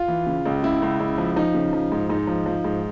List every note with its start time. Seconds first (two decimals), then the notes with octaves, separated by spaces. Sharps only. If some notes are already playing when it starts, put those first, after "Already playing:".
Already playing: F4
0.08 E3
0.27 C#3
0.46 C#2
0.63 C#3 E4
0.82 C#2
1.00 C#2
1.18 F3
1.36 F3 D#4
1.54 C#3
1.73 F3
1.92 G#2
2.09 G#2 D#4
2.27 F3
2.46 F3
2.64 G#2